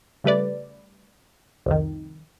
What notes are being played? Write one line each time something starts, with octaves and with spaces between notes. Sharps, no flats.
C#3 G3 A3 B4 D5
C2 F2 D#3